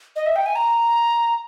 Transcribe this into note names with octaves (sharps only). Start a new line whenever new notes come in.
D#5
E5
G5
G#5
A#5